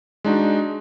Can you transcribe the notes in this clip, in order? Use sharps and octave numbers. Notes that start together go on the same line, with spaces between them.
G#3 D4 D#4 F#4